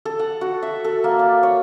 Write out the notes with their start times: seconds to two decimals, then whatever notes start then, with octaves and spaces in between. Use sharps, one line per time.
0.05 A4
0.19 F#5
0.41 F#4
0.63 E5
0.84 A4
1.04 A#3
1.19 D5
1.43 C#5